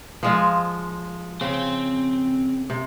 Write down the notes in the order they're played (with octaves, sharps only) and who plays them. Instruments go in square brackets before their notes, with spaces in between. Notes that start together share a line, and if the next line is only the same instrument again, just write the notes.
[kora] F3 G#3 F4
[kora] C#3 [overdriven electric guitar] C4 C5
[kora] C3